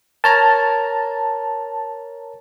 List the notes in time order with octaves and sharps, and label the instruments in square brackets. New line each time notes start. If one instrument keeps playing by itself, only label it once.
[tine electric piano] A#4 C#5 A#5 [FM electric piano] A5